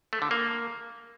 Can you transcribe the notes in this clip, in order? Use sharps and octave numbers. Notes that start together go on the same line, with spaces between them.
A3
D3
A#3